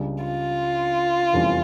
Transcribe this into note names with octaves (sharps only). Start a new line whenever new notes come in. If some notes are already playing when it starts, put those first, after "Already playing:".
Already playing: C#2 C#3 G3 D4
F4
F1 E2 E3 G3 C#4